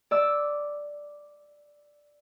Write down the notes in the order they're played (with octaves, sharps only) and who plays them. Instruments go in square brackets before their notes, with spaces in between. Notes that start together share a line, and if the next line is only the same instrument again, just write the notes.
[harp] D5 E6